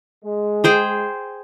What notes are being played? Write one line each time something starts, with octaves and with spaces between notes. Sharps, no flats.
G#3
G#4 C5 G5